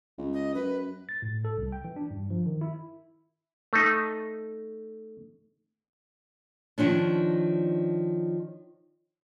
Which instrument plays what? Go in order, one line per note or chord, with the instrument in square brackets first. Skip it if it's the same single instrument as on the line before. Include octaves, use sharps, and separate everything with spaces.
[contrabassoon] C#2
[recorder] D#5
[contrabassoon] F#2 [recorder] B4
[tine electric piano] A6
A2
A4
C2
G5
E3
D4
G2
F3
D#3
E4
[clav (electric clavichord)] A3 D#4
[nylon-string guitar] D#3 F3 C#4 D4